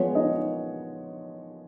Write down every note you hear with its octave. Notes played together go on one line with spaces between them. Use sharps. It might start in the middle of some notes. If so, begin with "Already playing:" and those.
Already playing: F3 G#3 B3 C#5
D#4 D#5